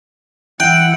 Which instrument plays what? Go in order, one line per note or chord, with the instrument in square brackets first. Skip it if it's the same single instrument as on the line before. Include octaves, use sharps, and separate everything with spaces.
[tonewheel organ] E3 E5 F#6 [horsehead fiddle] E4 F#5 [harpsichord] G5